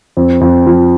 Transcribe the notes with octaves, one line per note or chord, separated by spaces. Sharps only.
F2
F2
F3